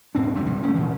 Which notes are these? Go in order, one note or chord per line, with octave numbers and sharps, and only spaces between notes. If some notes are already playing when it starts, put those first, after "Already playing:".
G#2 C4 D4
D1 F2 A2 G3
C3 F3 G3
A3 B3 C#4
A#2 D#3 E3